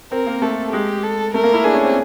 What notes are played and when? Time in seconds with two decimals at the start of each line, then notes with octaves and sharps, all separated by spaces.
0.12 C4 A#4
0.27 A#3
0.42 A3 A4
0.72 G#3 G4
1.03 A4
1.34 A3 A#4
1.44 A#3
1.53 E4
1.64 D4 G#4
1.74 C#4
1.84 C4